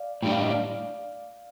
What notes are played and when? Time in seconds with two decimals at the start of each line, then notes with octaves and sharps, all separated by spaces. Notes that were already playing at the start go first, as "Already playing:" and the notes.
Already playing: D5 F5
0.22 A2 G3 D4 G5
0.32 F5
0.41 D#5
0.50 D5 F5